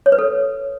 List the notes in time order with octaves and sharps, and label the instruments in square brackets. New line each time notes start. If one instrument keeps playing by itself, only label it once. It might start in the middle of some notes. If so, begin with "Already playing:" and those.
[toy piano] C#5
B4
A4